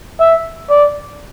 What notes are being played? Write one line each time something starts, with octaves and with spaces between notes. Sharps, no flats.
E5
D5